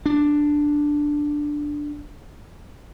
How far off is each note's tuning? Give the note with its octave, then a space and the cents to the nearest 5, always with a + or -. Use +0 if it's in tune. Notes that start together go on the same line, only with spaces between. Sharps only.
D4 +0